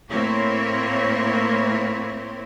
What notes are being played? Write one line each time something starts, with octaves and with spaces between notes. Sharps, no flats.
A2 A#3 C4 E4 C#5